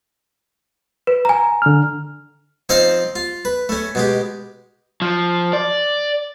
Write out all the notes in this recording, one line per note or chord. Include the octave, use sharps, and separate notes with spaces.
B4
G#5 A#5
D3 F6
F3 C4 D#4 C5 D#5 F5
F4
B4
A3 C#4
B2 G#3 G4
F3
D5